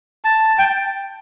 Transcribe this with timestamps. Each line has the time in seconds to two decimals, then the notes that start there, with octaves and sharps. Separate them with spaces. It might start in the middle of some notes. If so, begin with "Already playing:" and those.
0.25 A5
0.59 G5